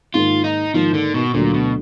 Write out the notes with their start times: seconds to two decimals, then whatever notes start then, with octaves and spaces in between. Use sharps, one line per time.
0.14 G#2 D#3 A#3 F4
0.44 D#4
0.74 G#2 D#3 F3 A#3
0.94 D3
1.14 B2
1.34 D2 A#2 D3 F#3
1.54 B2